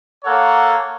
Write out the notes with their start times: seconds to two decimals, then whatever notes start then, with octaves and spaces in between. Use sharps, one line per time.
0.25 A#3 A4 C#5 F#5